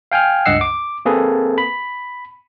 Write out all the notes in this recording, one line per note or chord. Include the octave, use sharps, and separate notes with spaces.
F5 G5 G#5 F6
C#2 G2 D#5 F#5 E6 C7
D6
A#3 C4 G#4 A4 B4
B5